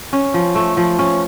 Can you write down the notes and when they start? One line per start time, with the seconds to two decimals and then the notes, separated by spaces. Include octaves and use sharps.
0.13 C#4
0.34 F3
0.55 A3
0.77 F3
0.99 C#4